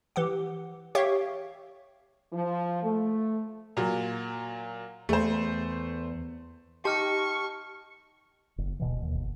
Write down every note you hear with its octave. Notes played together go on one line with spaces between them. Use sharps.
E3 G4 F#5
G4 C#5 E5 F5 G5 C#6
F3
A3
A#2 F#3
E2 A3 C5
D#4 G4 A5 C#6 F6 C#7
F#1
D1 B2 E3
D#2
G1